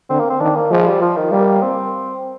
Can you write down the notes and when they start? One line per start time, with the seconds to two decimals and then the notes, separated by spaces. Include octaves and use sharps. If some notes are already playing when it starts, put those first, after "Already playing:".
0.10 D3 C4
0.19 A#3
0.30 C4
0.40 D#3 D4
0.56 A#3
0.70 F3 G#3
0.86 G3
1.01 F3
1.16 D#3
1.31 G3 A#3
1.62 C4